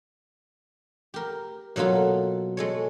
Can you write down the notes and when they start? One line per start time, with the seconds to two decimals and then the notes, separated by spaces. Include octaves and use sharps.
1.14 G4 A#4
1.76 B2 F#3 A#3 F4 A4
2.57 G#3 A4 C#5